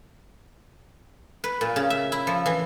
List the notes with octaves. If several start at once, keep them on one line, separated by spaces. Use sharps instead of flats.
B4
A#2
C#3
E5
E4
F3
E3